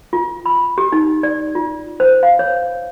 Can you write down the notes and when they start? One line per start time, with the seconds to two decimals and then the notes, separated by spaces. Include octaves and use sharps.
0.13 F4
0.46 B5
0.78 G4
0.92 D#4
1.23 D5
1.55 F4
2.00 C5
2.23 F5
2.39 C#5